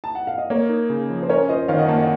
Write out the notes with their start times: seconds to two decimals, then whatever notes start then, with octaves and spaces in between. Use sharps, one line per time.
0.04 A5
0.15 F#5
0.27 F5
0.38 D#5
0.50 A#3 A#4 C#5
0.69 D#4
0.90 C#3
1.10 F3
1.22 C5
1.29 C#4 A#4 C#5
1.49 F4 C5 D#5
1.68 D#3 C#5 F5
1.78 D#5 F#5
1.88 A#3 F5 A5
1.98 D#5 F#5